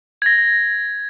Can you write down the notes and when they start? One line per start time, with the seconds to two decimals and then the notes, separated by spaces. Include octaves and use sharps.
0.22 G#6 A#6